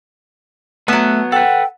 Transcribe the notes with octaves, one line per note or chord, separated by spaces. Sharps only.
F#3 A3 B3 E5
A4 B4 F#5 G5